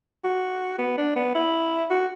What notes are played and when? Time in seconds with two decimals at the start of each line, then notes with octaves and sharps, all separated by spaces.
0.24 F#4
0.79 B3
0.98 D4
1.16 B3
1.35 E4
1.90 F#4